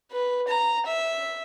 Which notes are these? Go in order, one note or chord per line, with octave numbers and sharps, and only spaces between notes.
B4
A#5
E5